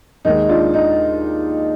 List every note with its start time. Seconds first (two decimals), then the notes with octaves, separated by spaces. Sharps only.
0.25 D#2 D#3 G#3 D#4
0.49 D4 F4
0.74 D#4